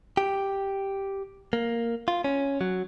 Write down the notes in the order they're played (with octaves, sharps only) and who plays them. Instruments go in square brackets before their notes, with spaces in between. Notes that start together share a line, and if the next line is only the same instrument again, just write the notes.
[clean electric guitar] G4
A#3
F4
C#4
F#3